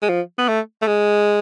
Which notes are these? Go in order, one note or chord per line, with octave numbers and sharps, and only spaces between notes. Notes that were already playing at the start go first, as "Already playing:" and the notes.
G#3
F3
B3
A3
A3
G#3